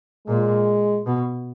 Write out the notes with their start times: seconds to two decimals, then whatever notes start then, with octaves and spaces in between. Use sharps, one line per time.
0.27 A#2 G#3
1.06 B2